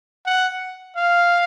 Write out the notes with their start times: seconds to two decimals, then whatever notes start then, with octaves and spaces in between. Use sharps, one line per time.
0.26 F#5
0.96 F5